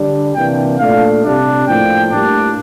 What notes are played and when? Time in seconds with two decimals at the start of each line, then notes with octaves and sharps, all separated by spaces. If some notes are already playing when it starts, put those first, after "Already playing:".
Already playing: D3 G3 D4
0.35 C3 E3 A#3 D4 G5
0.79 A#2 A3 D4 F5
1.23 C3 G3 D4
1.66 A2 F3 A#3 D4 G5
2.11 A2 G3 A#3 D4